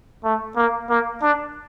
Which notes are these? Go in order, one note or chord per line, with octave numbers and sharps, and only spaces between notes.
A3
A#3
A#3
D4